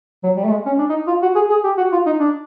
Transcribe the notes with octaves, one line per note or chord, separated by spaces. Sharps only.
F#3
G3
A3
G#3
C#4
D4
D#4
F4
F#4
G#4
G#4
G4
F#4
F4
D#4
D4